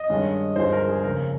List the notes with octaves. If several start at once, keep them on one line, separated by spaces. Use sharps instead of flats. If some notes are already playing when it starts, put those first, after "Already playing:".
Already playing: D#5
G2 D#3 G#3 C#4
G1 G2 F3 G#3 D#4 C5
A#4
G#4
F1 D#2 C#3 A#4